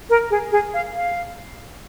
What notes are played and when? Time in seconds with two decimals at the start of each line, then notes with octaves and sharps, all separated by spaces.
0.10 A#4
0.31 G#4
0.52 G#4
0.74 F5
0.96 F5